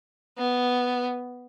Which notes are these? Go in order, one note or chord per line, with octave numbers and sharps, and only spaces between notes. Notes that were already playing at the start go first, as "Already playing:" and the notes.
B3